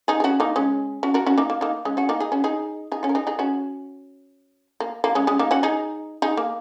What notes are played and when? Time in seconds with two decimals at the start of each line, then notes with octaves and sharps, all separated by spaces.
0.08 D#4 G#4
0.20 G#4
0.24 C#4 F#4
0.40 A#3 D#4
0.56 G#3 C#4
1.03 C#4 F#4
1.14 F#4 A#4
1.26 C#4 F#4
1.38 A#3 D#4
1.50 A#3
1.61 A#3 D#4
1.85 G#3 C#4
1.97 C#4 F#4
2.09 A#3 D#4
2.20 D#4 G#4
2.32 C#4 F#4
2.44 D#4 G#4
2.92 D#4 G#4
3.03 C#4 F#4
3.09 A#4
3.15 D#4 G#4
3.27 D#4 G#4
3.39 C#4 F#4
4.80 A#3
5.04 A#3
5.15 G#3 C#4
5.27 G#3 C#4
5.39 A#3 D#4
5.51 C#4 F#4
5.63 D#4 G#4
6.22 D#4 G#4
6.37 A#3